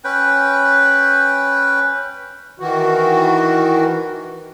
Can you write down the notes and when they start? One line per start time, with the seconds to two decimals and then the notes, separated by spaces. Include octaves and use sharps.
0.04 C#4 B4 G5
2.60 D#3 E3 F#4